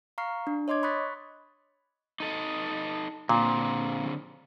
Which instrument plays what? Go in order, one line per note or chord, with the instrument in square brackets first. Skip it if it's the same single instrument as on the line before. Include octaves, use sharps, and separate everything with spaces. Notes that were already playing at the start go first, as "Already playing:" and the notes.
[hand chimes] F5 A#5 C#6 F6 C7
D4
C#5 D#5 C6 D6 G#6
B5 C#6 D#6 F#6 A6 B6
[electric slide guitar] D#4 A4 D#5
[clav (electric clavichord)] A#2 [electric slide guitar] D3 C4 F4